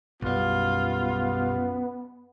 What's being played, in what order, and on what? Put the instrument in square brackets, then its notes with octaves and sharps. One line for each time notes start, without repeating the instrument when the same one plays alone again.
[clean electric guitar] B1 G3 [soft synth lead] F#2 [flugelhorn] B3 [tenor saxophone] F4